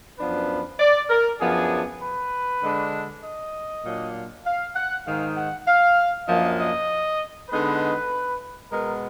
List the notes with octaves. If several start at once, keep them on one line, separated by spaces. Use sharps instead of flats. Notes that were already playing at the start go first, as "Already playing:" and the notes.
F#2 F3 B3 D4 B4
D5
A#4
F#2 F3 B3 D4 G#4
B4
D3 G#3 D4
D#5
A#2 F#3 D4
F5
F#5
G#2 D#3 G#3 D#4 F5
F#5
F5
F#2 F3 A#3 D4 D#5
D#5
D3 G#3 B3 D#4 B4
B2 G#3 B3 A#4